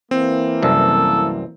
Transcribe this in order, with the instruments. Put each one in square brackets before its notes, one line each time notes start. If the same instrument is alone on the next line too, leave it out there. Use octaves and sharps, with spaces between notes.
[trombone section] E3 A#3 [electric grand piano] C4
[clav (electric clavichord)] C2 F#2 [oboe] A4